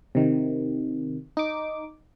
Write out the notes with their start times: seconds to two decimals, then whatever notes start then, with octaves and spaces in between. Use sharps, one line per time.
0.15 C3 D#3
1.37 D#4 D6